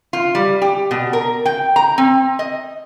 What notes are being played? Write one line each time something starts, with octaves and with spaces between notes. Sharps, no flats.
F4
G3
G4
B2
A#4
G5
A#5
C4
D#5